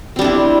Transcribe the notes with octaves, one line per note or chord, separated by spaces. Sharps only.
G3 C4 D4 E4